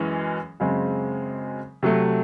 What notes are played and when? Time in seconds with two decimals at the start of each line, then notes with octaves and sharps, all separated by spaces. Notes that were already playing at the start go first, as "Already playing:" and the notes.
Already playing: F#2 E3 G#3 C#4
0.60 F#2 C#3 G#3 C4
1.83 C3 F#3 A3